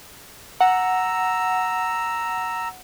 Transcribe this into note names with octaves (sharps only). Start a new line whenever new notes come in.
F#5 A#5 E6